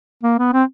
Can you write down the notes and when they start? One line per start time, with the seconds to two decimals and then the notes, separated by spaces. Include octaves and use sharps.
0.23 A#3
0.38 B3
0.53 C4